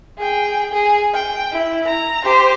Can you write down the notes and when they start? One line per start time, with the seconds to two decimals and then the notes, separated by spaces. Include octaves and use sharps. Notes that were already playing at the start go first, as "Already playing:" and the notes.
0.18 G#4 G5
0.72 G#4
1.14 G5
1.52 E4
1.86 A#5
2.23 G4 C5